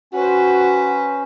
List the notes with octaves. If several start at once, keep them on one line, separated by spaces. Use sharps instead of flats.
C#4 F#4 B4 C5